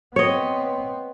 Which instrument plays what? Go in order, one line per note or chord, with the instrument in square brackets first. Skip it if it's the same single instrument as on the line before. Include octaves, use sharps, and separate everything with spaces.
[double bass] B3 C4 [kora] C#5 D#5